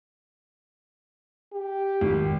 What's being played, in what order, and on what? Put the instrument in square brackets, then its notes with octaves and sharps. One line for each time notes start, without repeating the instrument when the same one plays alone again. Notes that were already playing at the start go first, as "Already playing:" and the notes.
[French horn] G4
[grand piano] G#1